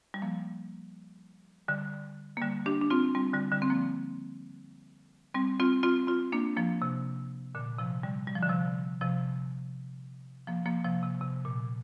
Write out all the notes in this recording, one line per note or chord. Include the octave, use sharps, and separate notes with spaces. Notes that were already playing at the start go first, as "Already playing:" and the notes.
G3
F3 A#3
D3 G3
A#3
D3 G3
D4 G4
D4
C4 F4
G3 C4
D3 G3
D3 G3
C4
F3 A#3
G3 C4
C4 F4
C4 F4
C4 F4
A#3 D4
F3 A#3
C3
A#2 D3
C3 F3
D3 G3
G3
F3
D3
C3 F3
C3 F3
F3 A#3
F3 A#3
C3 F3
C3
C3
A#2